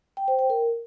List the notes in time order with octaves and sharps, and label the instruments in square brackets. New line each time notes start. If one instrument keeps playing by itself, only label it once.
[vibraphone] G5
C5
G5
A#4